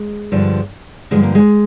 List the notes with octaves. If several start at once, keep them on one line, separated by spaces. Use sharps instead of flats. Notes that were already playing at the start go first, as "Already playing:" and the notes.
Already playing: G#3
G2 D3 F3
G2 D3 F3 G#3
A#3
G#3